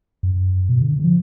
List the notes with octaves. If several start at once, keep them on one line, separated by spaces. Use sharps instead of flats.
F#2
B2
D3
D3
F3